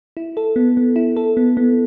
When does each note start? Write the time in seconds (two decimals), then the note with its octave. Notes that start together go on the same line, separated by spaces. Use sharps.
0.17 E4
0.37 A4
0.56 B3
0.77 B3
0.96 E4
1.17 A4
1.37 B3
1.57 B3